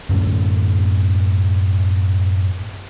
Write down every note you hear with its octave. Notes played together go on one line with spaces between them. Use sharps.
F#2 A2 D3 C#4